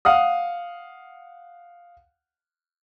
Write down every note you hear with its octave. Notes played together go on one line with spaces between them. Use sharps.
F5 F#5 D#6